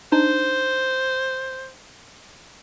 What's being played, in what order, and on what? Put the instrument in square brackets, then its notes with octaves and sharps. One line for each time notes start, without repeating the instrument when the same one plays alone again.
[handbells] D4 D#4 [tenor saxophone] C5